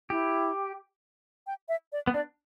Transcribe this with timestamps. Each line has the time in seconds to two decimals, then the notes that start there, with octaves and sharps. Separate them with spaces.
0.10 E4 G4
1.47 G5
1.69 E5
1.92 D5
2.07 B3
2.14 D4 D5